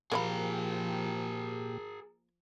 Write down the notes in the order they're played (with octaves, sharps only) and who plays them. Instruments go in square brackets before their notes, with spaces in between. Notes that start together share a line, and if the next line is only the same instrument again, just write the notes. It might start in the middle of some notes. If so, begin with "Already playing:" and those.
[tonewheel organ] A#2 G4 [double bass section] F3 [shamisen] A#3 D5 B5 [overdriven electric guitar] G#4 A#4